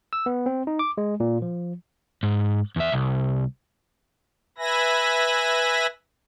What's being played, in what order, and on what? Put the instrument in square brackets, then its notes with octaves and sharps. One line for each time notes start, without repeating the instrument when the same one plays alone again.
[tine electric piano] E6
B3
C4
D#4
D6
G#3
A#2
F3
[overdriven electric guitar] G#2
E2 E5
C2
[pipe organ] B4 E5 G#5 B5 A#6